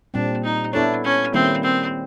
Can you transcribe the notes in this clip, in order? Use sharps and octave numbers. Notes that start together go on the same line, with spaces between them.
A#2 G3 C4 D4
D#4
B3 D4 E4 A4 C#5
C#4
D#3 G3 A#3 C4 C#4 E4
C4